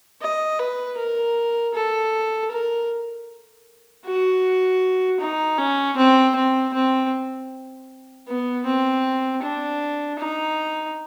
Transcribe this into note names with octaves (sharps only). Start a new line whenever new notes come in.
D#5
B4
A#4
A4
A#4
F#4
D#4
C#4
C4
C4
C4
B3
C4
D4
D#4